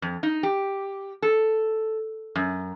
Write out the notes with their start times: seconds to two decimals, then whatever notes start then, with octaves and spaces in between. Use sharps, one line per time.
0.02 F2
0.23 D#4
0.43 G4
1.22 A4
2.35 F#2